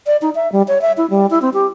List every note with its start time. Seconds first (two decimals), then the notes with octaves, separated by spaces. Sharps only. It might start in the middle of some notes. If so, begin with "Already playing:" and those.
0.07 D5
0.22 D#4
0.35 E5
0.52 G3
0.68 C#5
0.82 E5
0.97 E4
1.10 G3
1.30 E4
1.42 C4
1.54 G4